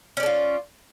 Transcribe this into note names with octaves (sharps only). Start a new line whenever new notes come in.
C#4 F4 A4 D5